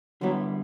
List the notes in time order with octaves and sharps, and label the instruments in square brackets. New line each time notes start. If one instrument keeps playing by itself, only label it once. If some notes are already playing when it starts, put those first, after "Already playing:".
[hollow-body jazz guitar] D3 G3 B3 E4 [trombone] F#3